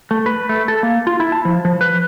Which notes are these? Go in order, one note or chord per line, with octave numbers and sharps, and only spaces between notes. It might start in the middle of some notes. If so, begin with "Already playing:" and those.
A3
B4
A3
A4
A#3
F4
E4
A5
F3
F3
B4